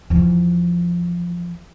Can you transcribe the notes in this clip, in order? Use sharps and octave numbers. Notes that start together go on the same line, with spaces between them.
E2 F3